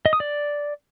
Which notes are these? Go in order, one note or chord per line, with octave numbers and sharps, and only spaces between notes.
D#5
D#6
D5